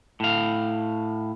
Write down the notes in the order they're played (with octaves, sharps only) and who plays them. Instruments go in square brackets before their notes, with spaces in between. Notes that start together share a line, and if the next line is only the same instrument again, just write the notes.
[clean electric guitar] A2 F5